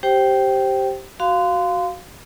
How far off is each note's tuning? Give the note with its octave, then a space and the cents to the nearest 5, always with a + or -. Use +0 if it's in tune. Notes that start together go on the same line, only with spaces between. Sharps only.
G4 -10 C5 +10 G5 -10
F#4 +10 F5 +0 C6 -25